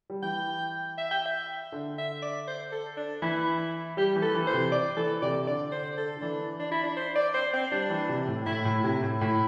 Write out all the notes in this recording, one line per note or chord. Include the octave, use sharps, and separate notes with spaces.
G3
E3 G5
E5
G5
E5
D3
E5
D5
C5
A4
D4
E3 E4
G3 G4
E3
A4
E3
C5
C3
D5
E3 A4
C3 D5
D3 D5
C5
A4
D3
E3 D4
D4
E4
D4
C5
D5
C5
C4
G3 D4
E3
C3
A2
A2 E4
A2
C3 E4
A2
A2 E4